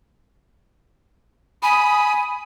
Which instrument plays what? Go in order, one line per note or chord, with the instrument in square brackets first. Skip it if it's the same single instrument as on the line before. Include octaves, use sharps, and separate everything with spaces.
[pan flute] G#5 [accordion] B5 D#6